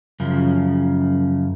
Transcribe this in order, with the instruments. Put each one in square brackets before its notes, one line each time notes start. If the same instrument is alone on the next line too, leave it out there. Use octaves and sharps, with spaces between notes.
[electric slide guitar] F#2 C#3 F3